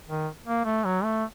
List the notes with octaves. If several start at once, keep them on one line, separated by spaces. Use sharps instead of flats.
D#3
A#3
A3
F#3
A3